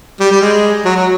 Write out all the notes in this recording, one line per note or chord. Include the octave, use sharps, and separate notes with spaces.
G3
G3
G#3
F#3
F#3